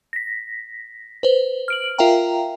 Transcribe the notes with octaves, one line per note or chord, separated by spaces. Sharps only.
A#6 B6
B4 C5
F6 D7 F#7
F4 A#4 E5 F5 G5 A#5